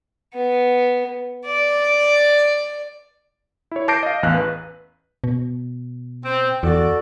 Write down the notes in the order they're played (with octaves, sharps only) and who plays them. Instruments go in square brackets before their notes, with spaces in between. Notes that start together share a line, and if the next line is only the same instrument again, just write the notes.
[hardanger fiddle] B3
D5
[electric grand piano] E4 C#5
A5 D6 G6 A#6 C7 D7
D#5 F5
A1 E2 F5 F#6
B4
[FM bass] B2
[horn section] C4
[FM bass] E2 [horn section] F#4 A4 D5